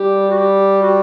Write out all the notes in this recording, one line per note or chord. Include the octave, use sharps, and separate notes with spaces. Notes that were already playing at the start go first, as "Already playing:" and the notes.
Already playing: G3 G4
F#4
G4
F#4